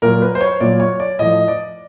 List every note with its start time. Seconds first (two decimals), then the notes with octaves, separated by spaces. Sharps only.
0.02 A#2 F#3 A#4
0.22 B4
0.35 C5
0.41 C#5
0.60 A#2 F#3 D5
0.80 C#5
1.00 D5
1.19 A2 F3 D#5
1.48 D5